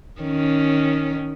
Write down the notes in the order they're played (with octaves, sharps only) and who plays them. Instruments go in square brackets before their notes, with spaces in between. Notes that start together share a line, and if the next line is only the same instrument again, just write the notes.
[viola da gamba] D#3 C#4